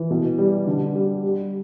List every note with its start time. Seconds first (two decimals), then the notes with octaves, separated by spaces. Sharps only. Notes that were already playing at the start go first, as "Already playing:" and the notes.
Already playing: E3
0.10 B2
0.38 G3
0.67 D3
0.95 G3
1.23 G3